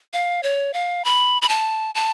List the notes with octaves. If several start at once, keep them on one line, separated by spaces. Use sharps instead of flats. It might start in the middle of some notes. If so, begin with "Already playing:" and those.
F5
C#5
F5
B5
B5
A5
A5